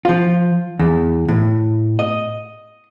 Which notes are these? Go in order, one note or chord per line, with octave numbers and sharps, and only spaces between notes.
F3 F4
E2
A2
D#5